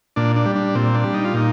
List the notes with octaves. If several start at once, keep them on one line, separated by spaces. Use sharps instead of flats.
A#2 D4
D4
G3
D4
A#2 C4
D4
G3
D#4
F4
A#2 D#4